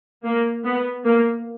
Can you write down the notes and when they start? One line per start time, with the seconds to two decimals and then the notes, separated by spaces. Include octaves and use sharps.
0.24 A#3
0.65 B3
1.04 A#3